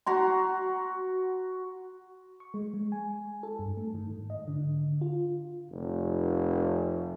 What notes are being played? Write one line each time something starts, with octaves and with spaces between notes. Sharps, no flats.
F#4 A#5 C6
C#6
G#3
G#3
G#5
A4
G2
A3
D#3
G#2
D#5
D3
F4
F1